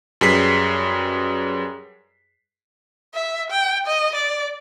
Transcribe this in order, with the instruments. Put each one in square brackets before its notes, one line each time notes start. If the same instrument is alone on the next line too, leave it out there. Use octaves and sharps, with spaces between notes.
[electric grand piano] F#2 G3 G#4 B4 B6 C7
[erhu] E5
G5
D#5
D5